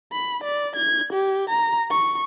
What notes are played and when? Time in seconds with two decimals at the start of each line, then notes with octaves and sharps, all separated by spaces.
0.12 B5
0.44 D5
0.76 G#6
1.13 G4
1.49 A#5
1.90 C#6